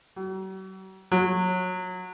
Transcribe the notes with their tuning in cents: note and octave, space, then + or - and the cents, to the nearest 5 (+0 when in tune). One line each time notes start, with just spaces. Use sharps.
F#3 +45
F#3 -20